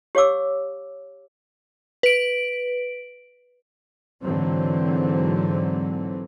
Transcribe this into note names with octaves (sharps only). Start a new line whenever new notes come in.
G4 C#5 F5 D6 E6
B4 D7
G#2 D3 E3 F#3 C4